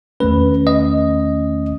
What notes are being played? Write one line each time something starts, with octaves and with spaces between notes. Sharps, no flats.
E2 D#3 A3 C#4 B4
D#5